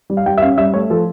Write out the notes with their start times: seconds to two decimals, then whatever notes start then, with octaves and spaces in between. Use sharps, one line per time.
0.10 G3
0.17 F5
0.26 G3 G5
0.38 E5
0.42 C#4 F5
0.58 G3 E5
0.74 A3 C#5
0.90 F3 A4